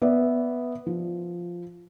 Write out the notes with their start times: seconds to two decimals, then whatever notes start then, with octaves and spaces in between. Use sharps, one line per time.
0.02 B3 B4 D5 E5
0.86 F3